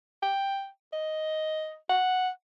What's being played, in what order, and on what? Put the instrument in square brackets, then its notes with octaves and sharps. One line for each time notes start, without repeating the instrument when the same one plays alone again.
[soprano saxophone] G5
D#5
F#5